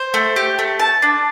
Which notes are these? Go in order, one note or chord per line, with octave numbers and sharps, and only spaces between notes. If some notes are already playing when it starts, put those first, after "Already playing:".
Already playing: C5
A3
G4
A3
A5
D4